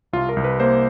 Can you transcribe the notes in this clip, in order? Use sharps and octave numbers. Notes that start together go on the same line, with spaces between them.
C2 F4
A#4
C2
B4
A#3 C5